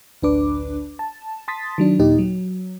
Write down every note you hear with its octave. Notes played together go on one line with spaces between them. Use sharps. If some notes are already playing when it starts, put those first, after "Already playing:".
A1 D2 D4 B4 D6
A5
A5 C6 D#6 A6 B6
D#3 F#3 D4
D#2 A#2 D#4 G4 D#5
F#3